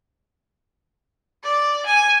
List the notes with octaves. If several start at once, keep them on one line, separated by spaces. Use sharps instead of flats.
D5
G#5